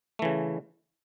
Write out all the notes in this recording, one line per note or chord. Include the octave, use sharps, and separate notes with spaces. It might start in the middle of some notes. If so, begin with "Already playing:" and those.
C#3 E3 A3